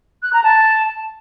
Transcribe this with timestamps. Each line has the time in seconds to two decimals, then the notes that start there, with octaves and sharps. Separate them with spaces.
0.23 F#6
0.33 A#5
0.44 A5